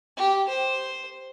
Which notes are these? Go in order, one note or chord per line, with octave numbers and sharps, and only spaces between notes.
G4
C5